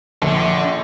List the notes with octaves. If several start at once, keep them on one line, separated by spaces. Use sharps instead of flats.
A#1 D3